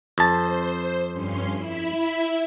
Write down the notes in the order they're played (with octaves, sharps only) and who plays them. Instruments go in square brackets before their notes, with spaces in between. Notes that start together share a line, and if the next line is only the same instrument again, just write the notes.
[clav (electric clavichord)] F2 A5 [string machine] C5
[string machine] G2 C#4 C6
E4 E5 B5